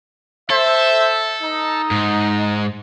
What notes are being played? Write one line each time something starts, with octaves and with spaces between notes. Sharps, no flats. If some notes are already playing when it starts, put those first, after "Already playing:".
A4 C5 E5
D#4
G#2